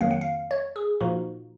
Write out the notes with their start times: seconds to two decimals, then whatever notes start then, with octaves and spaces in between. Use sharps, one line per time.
0.01 F2 D#3 F#3 A#3 F5
0.11 F#5
0.21 F5
0.51 C#5
0.76 G#4
1.01 A#2 F3 A#3 D#4 F#4